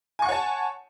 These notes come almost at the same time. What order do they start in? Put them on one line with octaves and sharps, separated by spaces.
G#5 C#6 F#5 C#5 A5